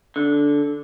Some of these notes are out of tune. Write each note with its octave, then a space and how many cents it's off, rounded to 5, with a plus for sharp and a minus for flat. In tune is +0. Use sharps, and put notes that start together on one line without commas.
D3 -10